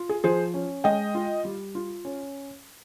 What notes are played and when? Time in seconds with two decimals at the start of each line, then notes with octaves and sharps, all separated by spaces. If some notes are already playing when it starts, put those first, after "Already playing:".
Already playing: F4
0.09 G#4
0.24 F3 G#4 C5
0.54 C#4
0.84 G#3 D#5 G5
1.15 F4
1.45 G3
1.75 F4
2.05 C#4